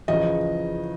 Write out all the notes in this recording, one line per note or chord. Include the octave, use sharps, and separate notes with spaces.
E2 C#3 F3 D#5